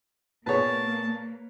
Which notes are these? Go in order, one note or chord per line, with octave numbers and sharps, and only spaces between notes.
A#2 A#3 B3 G#4 B4 C#5 A5